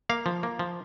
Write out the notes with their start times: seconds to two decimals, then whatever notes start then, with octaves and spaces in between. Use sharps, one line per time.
0.09 A#3 F5
0.26 F3
0.43 A#3
0.59 F3